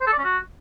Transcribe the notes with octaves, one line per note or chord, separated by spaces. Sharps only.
C5
A4
D5
C#4
F#4